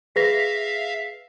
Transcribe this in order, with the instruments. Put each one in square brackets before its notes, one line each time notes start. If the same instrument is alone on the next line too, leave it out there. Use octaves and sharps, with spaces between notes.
[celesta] G#4 B4 A#6 [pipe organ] E5 F5